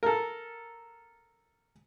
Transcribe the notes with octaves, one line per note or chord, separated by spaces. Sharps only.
A4 A#4